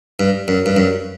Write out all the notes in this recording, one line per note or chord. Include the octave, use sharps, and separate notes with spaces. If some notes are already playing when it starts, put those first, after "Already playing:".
G2
F#2
G2
F#2